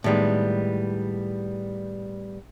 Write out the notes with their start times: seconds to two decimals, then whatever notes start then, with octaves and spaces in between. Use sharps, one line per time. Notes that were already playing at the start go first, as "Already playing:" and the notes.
0.04 A2 D#3 G3 G#3 B3